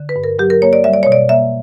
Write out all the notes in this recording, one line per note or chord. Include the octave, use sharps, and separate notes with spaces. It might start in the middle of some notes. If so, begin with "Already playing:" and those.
Already playing: D3
B4
G2
A#4
F#3 G4
A#4
A#3 C#5
D5
G3 E5
D5
B2 C#5
D5
A#3 E5